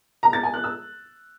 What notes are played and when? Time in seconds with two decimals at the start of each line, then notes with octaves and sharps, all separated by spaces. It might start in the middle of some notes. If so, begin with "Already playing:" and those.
0.23 A#5
0.33 A6
0.43 G#5
0.54 F#6
0.64 E6